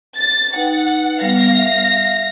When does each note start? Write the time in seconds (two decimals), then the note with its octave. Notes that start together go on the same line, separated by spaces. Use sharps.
0.17 A6
0.56 D#4 B4 F#5 G5
1.21 G3 B3 F5 A#6
1.55 E5
1.91 E5